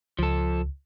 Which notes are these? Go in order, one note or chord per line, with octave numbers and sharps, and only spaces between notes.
C#2 F3 A4